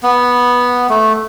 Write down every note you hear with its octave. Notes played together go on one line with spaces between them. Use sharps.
B3
A3